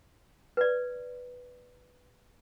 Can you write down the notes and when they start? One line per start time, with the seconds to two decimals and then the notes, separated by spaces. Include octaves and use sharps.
0.57 B4 D5